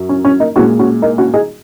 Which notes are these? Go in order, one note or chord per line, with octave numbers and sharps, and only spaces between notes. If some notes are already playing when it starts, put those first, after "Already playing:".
Already playing: F#2 F#3
C#4
C#4
A#3 D#4
A#2 G#3 C#4 F#4
C#4 F#4
A#3 D#4
C#4 F#4
D#4 G#4